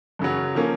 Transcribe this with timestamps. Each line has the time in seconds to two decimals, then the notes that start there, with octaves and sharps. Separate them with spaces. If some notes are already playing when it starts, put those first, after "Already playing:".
0.19 F#2 C#3 F#3
0.55 F3 A#3 C#4